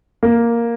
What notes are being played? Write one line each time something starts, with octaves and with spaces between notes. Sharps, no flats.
A#3